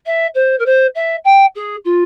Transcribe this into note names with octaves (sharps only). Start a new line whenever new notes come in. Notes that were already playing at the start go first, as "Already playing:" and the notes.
E5
C5
A#4
C5
E5
G5
G#4
F4